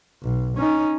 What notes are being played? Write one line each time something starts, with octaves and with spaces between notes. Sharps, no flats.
B1
C#4 D#4